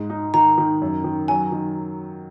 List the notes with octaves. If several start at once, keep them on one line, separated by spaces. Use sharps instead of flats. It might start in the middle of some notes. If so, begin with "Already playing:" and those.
Already playing: G#2 G#3
D#4
D#3 A#5
D#3
F#2
D#3
F#3 G#5
D#3